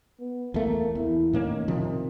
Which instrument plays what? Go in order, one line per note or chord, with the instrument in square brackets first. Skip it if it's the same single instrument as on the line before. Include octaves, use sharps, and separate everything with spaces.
[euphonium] B3
[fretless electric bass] E2 A3 [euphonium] A#3
[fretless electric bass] E2 [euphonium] E4
[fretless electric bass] A2 A#3 C#4 [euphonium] D#3
[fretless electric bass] C3 F3